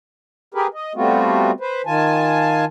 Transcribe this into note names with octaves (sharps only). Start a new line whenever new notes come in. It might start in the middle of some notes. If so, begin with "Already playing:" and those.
G4 G#4 A#4 B4
D#5
G3 A3 B3 C4 F4 F#4
B4 C5
D#3 F4 G#5 A5